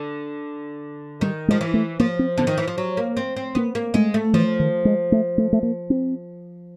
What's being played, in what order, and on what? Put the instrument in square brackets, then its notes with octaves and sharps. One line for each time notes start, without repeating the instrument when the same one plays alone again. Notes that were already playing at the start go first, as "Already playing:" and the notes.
Already playing: [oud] D3
[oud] D#3 [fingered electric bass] G3
[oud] F3 [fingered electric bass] G#3
[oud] E3
[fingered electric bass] A3
[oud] F3 [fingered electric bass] A#3
[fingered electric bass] C4
[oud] D3 [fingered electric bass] B3
[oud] D#3
E3
F3
F#3
A#3
C4
C4
[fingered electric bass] A#3 [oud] B3
[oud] A#3
[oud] G#3 [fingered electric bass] A3
[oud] A3
[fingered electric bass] E3 [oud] F3
[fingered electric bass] D#3
G#3
A3
A3
A3
A#3
C4